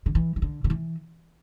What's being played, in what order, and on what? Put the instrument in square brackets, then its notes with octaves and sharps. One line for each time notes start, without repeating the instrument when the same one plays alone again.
[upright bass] D3
E3
E3
D3
D3
E3